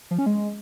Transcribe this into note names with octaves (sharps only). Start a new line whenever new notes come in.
F3
C#4
G#3